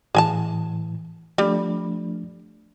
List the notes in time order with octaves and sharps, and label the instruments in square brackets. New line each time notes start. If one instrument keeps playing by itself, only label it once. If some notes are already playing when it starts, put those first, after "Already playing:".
[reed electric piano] A2 E3 [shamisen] G#4 G#5 A5
[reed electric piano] F3 A3 D4 [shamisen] G3